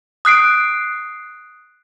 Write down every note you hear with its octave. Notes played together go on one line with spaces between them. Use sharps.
D#6 F#6 C7 D7